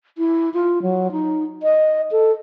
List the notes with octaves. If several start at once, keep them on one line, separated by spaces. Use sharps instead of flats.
E4
F4
F#3
D#4
D#5
A4